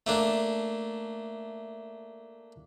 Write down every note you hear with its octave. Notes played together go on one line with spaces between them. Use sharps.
A3 A#3 D4